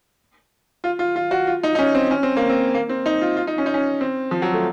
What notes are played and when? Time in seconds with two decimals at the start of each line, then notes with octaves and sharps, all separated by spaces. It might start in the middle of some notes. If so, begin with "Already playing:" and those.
0.84 F4
0.99 F4
1.16 F4
1.31 F#4
1.47 F4
1.63 D#4
1.75 D#4
1.79 C#4
1.94 C4
2.11 C#4
2.23 C4
2.37 A#3
2.49 C4
2.74 A#3
2.89 C4
3.06 D#4
3.21 F4
3.37 F4
3.47 D#4
3.58 C#4
3.66 D#4
3.74 C#4
4.01 C4
4.31 F3
4.42 F#3
4.54 A3